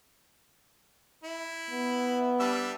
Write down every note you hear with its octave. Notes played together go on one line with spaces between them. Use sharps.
E4
B3
G3 D4 E5